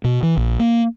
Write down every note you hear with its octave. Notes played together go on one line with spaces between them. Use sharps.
B2
E3
A#1
A#3